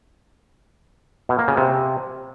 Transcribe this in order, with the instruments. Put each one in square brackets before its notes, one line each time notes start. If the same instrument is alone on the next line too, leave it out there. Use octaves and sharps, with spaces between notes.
[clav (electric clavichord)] B2
A#3
C#3
C3